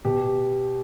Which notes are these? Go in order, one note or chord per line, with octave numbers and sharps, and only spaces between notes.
B2 G4